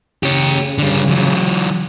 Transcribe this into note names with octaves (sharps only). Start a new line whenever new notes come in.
C#3 G4 C#5
D3 G3
E3 F#3